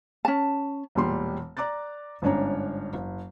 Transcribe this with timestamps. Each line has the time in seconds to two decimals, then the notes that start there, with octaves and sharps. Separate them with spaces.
0.25 C#4 A5
0.95 E1 A#2 G3 C6
1.57 D5 A#5 D6 F#6 A6
2.22 G1 G#2 C#4 D4 C#5 A#5
2.93 F#1